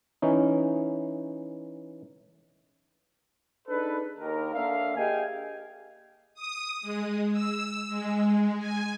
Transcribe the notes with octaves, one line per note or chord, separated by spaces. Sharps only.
E3 C#4 D#4
D4 D#4 G#4 A4 B4
D#2 A#4
D3 A#3 D4 E5 F5
G4 G#4 D#5 F5 G5 G#5
D#6
G#3
E6
G#3
G#5